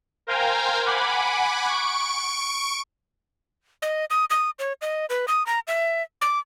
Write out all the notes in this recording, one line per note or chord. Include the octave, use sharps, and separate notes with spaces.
A#4 C5 F5 G5 G#5 A#5
F#5 G#5 B5 D6
C#6 D7
D#5
D#6
D#6
C#5
D#5
B4
D#6
A#5
E5
D6